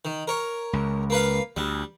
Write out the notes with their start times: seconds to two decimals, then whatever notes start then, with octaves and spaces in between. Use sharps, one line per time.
0.05 D#3
0.28 A#4 C#5
0.73 C#2
1.10 A#3 B4 F5
1.57 D2 G3